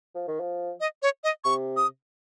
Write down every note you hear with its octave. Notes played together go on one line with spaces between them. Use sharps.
F3
D#3
F3
D#5
C#5
D#5
C3 C#6
D#6